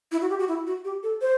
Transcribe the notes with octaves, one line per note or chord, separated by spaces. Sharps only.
E4
F#4
G4
F#4
E4
F#4
G4
A4
C5